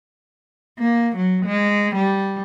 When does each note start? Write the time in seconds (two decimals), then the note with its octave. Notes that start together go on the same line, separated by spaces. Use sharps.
0.79 A#3
1.17 F#3
1.46 G#3
1.96 G3